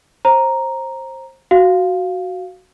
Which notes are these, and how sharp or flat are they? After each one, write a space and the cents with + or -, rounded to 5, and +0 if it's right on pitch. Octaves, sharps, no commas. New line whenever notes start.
C5 +25 A#5 +0
F#4 +0 F5 +0